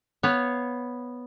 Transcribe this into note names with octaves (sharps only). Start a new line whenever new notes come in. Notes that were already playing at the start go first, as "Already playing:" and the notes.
B3 C#5 F5